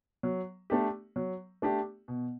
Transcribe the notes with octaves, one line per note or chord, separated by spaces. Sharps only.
F#3
A3 D4 G4
F#3
A3 D4 G4
B2